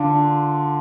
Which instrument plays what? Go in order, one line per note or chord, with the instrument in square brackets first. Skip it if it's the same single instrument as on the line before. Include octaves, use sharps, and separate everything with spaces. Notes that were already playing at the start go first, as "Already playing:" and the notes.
Already playing: [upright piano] D3 [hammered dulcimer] D4 F4